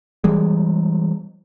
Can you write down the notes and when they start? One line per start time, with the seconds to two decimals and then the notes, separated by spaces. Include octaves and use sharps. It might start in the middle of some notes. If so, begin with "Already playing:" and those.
0.24 E3 G3 G#3